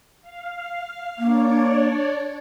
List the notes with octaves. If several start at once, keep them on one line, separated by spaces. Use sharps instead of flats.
F5
A#3 D4 C#5 D5